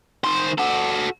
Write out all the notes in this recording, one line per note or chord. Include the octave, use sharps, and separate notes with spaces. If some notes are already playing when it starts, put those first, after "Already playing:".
D#3 C5
F#4 A4